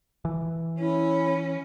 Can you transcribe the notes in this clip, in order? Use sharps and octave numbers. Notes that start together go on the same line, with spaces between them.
E3
C#4 E4